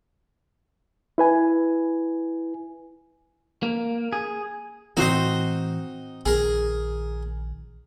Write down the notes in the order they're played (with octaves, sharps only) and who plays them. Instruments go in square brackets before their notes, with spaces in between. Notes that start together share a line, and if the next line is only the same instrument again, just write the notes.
[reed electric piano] E4 B4 G#5
[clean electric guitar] A#3
G#4
[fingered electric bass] A2 E3 [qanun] C4 F#4 C5 [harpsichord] D#4 D#5
[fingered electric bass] A#1 D#3 [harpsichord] G#4 A#4